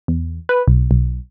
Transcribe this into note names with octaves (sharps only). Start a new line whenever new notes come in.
E2
B4
B1
B1